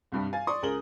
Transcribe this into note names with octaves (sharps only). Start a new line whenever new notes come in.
C2 G2 G3
F5 G#5 A6
D5 C6 C#6 D#6
C#2 G#4 A#4 F#7 G7